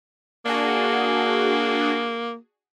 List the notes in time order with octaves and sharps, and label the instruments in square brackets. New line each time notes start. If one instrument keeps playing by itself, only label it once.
[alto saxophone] A#3 [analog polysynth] D4 F#4 G#4